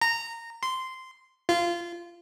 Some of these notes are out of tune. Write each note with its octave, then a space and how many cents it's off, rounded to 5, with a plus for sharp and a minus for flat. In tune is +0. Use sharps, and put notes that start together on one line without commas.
A#5 -15
C6 -10
F4 -20